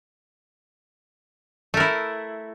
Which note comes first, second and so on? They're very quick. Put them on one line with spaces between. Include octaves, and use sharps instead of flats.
A3 A#4 E4